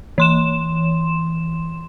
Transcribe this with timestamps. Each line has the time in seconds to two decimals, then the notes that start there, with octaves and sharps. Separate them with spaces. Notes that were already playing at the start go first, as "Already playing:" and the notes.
0.18 E3 C6 E7